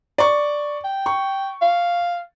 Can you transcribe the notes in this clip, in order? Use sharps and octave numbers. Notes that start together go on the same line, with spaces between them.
D5 C#6
G5
C#6
F5